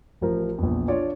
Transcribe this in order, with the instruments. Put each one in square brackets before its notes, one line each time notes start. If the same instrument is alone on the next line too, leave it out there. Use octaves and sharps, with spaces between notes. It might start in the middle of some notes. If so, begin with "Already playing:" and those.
[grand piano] A1 F3 A#4
A#1 E2
D4 F4 C#5 D5